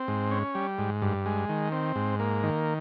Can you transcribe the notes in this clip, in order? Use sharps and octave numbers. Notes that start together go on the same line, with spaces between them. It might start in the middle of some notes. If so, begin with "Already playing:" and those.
Already playing: C4
G#2
C#4
G3
G#2
G2
G#3
D#3
C4
G#2
A#3
D#3